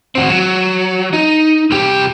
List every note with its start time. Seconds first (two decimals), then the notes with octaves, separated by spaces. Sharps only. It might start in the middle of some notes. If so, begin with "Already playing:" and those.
0.15 C4 F#4
0.29 F#3
1.13 D#4
1.71 C2 G4